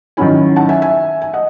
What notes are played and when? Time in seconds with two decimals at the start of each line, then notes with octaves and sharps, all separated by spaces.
0.17 D#3 F#3 C#4 E4 G#5 B5
0.56 F#5 A5
0.69 E5 G#5
0.82 E5 G#5
1.22 G#5
1.33 D#5 F#5